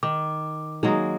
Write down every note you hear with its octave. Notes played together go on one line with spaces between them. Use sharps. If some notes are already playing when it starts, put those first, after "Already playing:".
D#3 D6
F#3 G#3 A#3 D#4 G#4